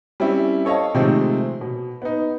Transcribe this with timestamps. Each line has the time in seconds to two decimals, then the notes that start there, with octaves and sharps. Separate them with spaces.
0.20 G3 C4 C#4 E4
0.65 A4 C#5 D#5 F5 A5
0.94 C3 D#3 F3 G#3 A3 C4
1.61 B2
2.02 B3 D#4